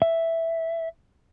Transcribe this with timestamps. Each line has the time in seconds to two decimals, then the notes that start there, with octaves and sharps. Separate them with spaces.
0.02 E5